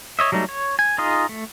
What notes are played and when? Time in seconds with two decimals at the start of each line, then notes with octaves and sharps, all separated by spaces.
0.19 C#5 D#5 E5
0.32 F#3 G3 A3 D#4
0.49 C#5
0.79 G#5
0.98 D#4 F4 G#4 D#5
1.29 A3